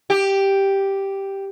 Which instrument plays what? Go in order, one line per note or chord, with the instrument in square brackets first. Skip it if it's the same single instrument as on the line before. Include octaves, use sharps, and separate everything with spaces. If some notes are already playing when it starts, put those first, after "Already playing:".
[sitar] G4